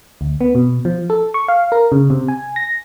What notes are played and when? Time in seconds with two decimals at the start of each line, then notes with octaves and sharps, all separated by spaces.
0.21 D2
0.41 B3
0.55 B2
0.85 F3
1.10 A4
1.34 C#6
1.48 F5
1.72 A#4
1.92 C#3
2.10 C3
2.28 G#5
2.56 A#6